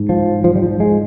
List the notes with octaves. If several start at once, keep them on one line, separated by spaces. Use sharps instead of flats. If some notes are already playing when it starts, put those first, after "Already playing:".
Already playing: G#2
F3
F3
G3
F3
G#3